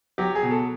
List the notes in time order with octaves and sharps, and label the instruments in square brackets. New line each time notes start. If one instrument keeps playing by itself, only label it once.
[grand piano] F#3 G4
G#4
B2
A4